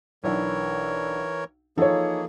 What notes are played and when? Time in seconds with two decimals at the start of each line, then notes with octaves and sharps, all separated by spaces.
0.24 B1 E3 D4 E4 A#4 C#5
1.77 E3 F3 A#3 D#4 G#4 A4 C#5 D#5